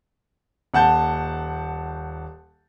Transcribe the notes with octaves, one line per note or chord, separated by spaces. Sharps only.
D#1 F#5 A5 G6